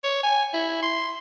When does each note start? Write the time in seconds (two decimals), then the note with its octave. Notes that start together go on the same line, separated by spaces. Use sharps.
0.04 C#5
0.23 G#5
0.54 E4
0.83 C6